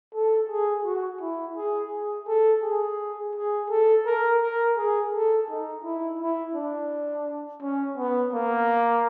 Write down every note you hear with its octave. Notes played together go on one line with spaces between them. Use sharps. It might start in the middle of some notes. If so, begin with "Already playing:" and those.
A4
G#4
F#4
E4
G#4
G#4
A4
G#4
G#4
A4
A#4
A#4
G#4
A4
D#4
E4
E4
D4
C#4
B3
A#3